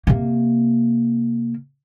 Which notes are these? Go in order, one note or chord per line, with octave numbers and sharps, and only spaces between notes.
C3 A#3